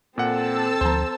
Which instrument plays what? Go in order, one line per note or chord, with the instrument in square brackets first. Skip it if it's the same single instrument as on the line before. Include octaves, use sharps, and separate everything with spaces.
[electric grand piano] A#2 F#5 [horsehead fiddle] C4 A4 [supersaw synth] A5 E6
[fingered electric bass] D2 F3 [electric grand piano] C5 A#5